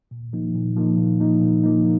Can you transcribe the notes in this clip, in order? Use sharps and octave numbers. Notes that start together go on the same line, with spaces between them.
A#2
F3 A#3 D#4
A#2
F3 A#3 D#4
A#2
F3 A#3 D#4
A#2
F3 A#3 D#4